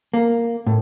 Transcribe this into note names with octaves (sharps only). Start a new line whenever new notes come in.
A#3
A2